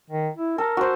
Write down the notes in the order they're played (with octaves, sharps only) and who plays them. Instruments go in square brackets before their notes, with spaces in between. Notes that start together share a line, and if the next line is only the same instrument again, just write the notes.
[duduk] D#3
E4
[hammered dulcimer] A4 [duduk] A#4
[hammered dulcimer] F#4 C5